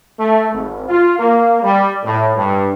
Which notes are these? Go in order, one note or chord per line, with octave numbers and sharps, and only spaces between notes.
A3
G#1
F4
A#3
G3
A2
G2